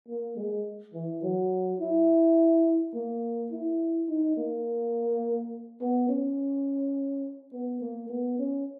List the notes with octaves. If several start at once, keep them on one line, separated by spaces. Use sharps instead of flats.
A#3
G#3
E3
F#3
E4
A#3
E4
D#4
A#3
B3
C#4
B3
A#3
B3
C#4